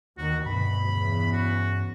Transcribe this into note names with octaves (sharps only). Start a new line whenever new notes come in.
D#2 D#3 F#4
D2 G2 B2 B5
E2 C#3
F#4